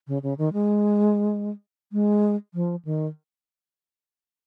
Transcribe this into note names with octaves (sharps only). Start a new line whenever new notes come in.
C#3
C#3
D#3
G#3
G#3
F3
D#3